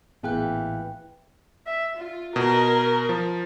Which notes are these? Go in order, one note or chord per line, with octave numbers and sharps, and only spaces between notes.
A1 A#2 E3 B3 G#4 F5 G5 F#6
E5
F4
B2 A#4
F3